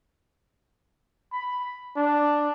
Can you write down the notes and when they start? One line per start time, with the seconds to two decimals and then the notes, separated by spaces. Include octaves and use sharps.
1.32 B5
1.96 D4